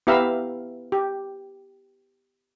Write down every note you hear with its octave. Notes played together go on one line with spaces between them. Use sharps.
B3 E4 G4 E5 F5 A#5
G4